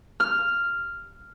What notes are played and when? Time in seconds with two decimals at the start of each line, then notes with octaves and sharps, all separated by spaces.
0.20 F6